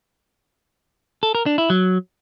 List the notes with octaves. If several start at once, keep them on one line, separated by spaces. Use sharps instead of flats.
A4
A#4
D4
E4
F#3